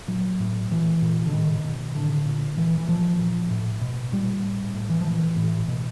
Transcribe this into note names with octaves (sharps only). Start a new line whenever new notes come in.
A#2 F#3
A2
A#2 E3
A#2
D3
A2 D#3
B2
A2 D3
A#2
A#2 E3
E3
A#2 F3
A#2
A2
B2
A#2 G3
A2
A2
E3
F3
A#2 E3
A2
B2